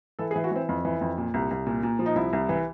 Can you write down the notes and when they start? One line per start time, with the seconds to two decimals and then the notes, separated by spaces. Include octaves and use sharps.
0.19 E3 A4
0.31 G#4
0.36 E3
0.44 F#4
0.52 E3 C4
0.69 F2
0.85 E3
1.01 F2
1.17 A#2
1.34 C2
1.51 C2
1.67 A#2
1.83 A#2
1.99 F3
2.06 D#4
2.16 C2 E4
2.33 C2
2.49 E3